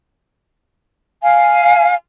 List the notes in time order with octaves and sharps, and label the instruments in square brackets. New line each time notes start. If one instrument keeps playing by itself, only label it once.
[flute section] F5 G#5